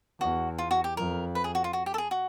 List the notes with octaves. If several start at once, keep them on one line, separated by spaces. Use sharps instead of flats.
E2 F#4
F4
F#4
G4
F2 A#4
B4
G#4
F#4
F4
F#4
G4
A4
G#4
F#4